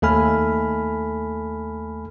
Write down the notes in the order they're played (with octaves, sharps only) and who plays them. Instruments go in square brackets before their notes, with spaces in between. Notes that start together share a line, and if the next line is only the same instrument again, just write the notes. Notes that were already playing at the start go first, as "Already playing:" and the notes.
[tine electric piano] D#2 A3 A4 G#5 B5 F6